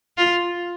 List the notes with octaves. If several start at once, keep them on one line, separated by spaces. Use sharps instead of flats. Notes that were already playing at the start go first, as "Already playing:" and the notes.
F4